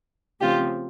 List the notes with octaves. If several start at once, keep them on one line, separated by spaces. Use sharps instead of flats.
C#3 F3 A3 C4 F4 G4